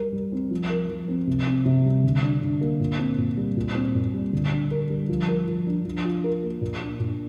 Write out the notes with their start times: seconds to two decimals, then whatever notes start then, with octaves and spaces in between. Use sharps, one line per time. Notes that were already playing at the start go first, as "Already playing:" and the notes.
Already playing: G3 A#4
0.12 G3
0.32 C4
0.51 F3
0.70 A#4
0.89 F3
1.08 C4
1.27 C3
1.47 C4
1.66 C3
1.85 G3
2.04 D3
2.23 D4
2.42 D3
2.61 A#3
2.80 A#2
2.99 C4
3.18 A#2
3.37 G3
3.57 A#2
3.75 C4
3.95 A#2
4.13 G3
4.33 D3
4.51 D4
4.71 A#4
4.90 G3
5.09 F3
5.28 A#4
5.47 F3
5.67 D4
5.85 F3
6.05 F4
6.24 A#4
6.43 A#3
6.61 A#2
6.81 D4
7.00 A#2